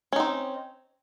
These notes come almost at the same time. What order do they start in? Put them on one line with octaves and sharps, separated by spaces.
C#4 D#4 C4